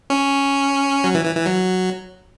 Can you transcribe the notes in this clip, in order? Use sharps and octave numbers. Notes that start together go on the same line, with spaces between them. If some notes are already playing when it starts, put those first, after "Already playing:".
C#4
F#3
E3
E3
E3
F#3